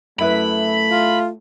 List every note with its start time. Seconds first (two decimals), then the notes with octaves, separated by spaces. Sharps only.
0.19 F#2 A3 E4 B4 B5
0.88 F4